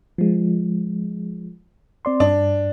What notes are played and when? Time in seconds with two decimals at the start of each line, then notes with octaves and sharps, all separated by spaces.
0.18 F3 G#3
2.05 C4 D5 C6
2.20 G2 D4